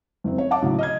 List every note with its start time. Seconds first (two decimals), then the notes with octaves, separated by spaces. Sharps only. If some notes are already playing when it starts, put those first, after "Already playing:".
0.24 F#1 C4
0.38 C#5
0.51 E5 F#5 A5 D6
0.62 A2 C#3 F#3
0.79 D#5 F6 G#6